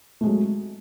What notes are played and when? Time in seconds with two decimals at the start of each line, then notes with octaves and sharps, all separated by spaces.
0.21 A3
0.23 G#3
0.26 F#3